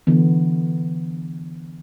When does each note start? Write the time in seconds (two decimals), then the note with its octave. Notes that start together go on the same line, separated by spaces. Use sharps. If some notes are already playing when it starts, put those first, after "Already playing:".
0.07 D3 E3 B3